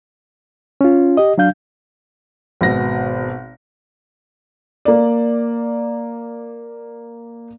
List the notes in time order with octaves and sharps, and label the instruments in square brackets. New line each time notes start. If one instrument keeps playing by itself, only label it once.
[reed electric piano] C#4 F4
G4 D#5
F#3 D4 F5 G6
[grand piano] G#1 B2 A#6
[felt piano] A#3 D5